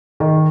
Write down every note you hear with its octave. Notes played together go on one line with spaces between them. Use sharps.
D#3